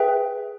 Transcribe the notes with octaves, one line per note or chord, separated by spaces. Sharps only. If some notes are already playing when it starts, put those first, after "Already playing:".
Already playing: G#4 B4 E5 G5